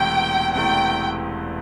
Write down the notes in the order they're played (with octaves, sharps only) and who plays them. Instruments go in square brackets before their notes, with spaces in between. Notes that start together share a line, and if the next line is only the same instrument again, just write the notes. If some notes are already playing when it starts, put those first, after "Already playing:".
Already playing: [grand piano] E1 E2 C3 E3 A3 [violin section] G5
[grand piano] E1 E2 C3 E3 A3 [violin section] G5